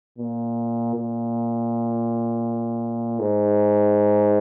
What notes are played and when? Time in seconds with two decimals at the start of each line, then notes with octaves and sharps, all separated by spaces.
0.18 A#2
0.95 A#2
3.20 G#2